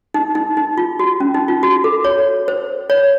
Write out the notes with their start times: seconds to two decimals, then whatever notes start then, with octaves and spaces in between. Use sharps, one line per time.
0.14 D#4
0.35 D#4
0.57 D#4
0.78 F4
0.99 F#4
1.20 C#4
1.34 D#4
1.48 F4
1.63 F#4
1.84 A4
2.05 C#5
2.48 C5
2.90 C#5